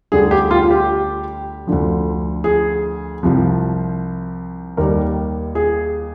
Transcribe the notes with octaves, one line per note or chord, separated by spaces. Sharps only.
D2 D3 G3 G#4
G4
F4
G4
D2 D3 F3
G#4
C2 C3 F3
D#2 D#3 G3 A#4
G#4